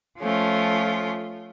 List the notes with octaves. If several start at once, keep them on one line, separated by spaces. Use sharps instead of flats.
F3 A3 C#4 F4